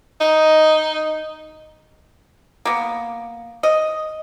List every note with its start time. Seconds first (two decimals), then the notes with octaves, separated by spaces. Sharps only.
0.21 D#4
2.65 A#3 B3
3.63 D#5